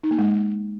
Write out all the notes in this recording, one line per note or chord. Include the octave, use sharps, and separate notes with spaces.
D#4
A#3
G#3